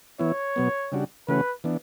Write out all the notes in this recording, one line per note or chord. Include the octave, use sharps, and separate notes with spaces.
E3 B3 E4 C#5
B2 F#3 B3
C#3 G3 D4 F#4
C#3 E3 A3 C#4 F#4 B4
E3 B3 D4